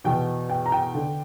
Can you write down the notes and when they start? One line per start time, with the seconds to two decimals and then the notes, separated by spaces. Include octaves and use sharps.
0.04 E2 B2 G5
0.50 G5
0.66 A#5
0.72 G5
0.95 D3